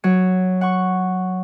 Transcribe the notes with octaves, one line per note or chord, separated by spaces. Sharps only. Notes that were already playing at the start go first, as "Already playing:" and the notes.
F#3 C#5
F#5 C#6